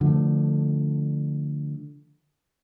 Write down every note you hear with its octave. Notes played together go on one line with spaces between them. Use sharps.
D3 F3 A3